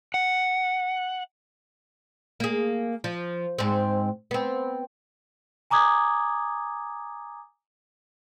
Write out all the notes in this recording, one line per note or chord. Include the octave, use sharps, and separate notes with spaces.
F#5
A#3 G#4
F3
G#2 C4
B3 C4
G#5 A#5 D6 D#6 G#6